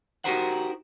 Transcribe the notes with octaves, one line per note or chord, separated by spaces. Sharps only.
D#4 F#4 G4 A#4 C5 F#5